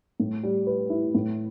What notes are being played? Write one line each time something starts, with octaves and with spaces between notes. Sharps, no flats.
A2
G3
B4
E4
A2